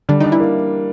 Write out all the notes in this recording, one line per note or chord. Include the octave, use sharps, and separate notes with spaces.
D3 G3 D4
D#3 D4 D#4
E3 E4
A#3